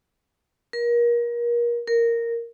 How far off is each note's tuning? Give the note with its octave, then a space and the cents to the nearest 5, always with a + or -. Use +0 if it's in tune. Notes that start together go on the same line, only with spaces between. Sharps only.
A#4 +30
A#4 -5